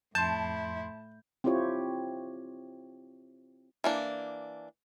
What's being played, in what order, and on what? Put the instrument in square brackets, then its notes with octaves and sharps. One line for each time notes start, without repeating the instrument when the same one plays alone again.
[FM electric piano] F2 C6 [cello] A2 E4 [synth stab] A5 [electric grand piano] G6
[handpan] C4 E4 F4 G4 C#5
[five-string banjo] E3 A#3 D4